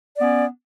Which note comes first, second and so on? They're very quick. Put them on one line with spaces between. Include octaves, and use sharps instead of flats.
D5 B3 C#4